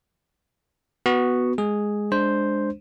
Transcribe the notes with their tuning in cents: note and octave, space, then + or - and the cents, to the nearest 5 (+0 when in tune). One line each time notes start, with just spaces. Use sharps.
B3 +0 F#4 +0
G#3 +0 G#4 +0
G#3 +0 D4 +5 C5 +0